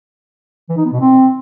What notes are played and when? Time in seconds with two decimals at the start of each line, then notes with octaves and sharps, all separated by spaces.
0.69 E3
0.77 D#4
0.85 B3
0.92 B2
1.00 C4